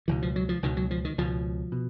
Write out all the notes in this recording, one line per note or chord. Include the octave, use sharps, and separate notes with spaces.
C#2 B2 E3
F3
F#3
F3
C#2 B2 D#3
F#3
F3
D#3
C#2 B2 F3
B2